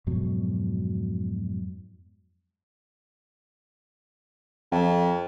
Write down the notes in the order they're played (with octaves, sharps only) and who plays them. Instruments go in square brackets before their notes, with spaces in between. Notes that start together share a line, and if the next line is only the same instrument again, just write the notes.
[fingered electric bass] F2 G#2 B2 F#3
[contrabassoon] F2